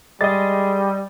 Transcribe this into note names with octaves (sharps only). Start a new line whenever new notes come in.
G3 G#3 D#5 A6